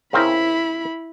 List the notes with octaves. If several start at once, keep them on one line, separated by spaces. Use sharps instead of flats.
C#3 C4 E4 A#4 B5